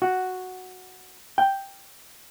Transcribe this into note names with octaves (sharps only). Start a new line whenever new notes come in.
F#4
G5